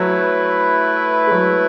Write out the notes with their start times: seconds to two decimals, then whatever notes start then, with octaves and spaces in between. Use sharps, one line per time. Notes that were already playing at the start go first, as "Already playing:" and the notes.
Already playing: F#3 A3 E4 B4
1.27 G#3
1.32 F#3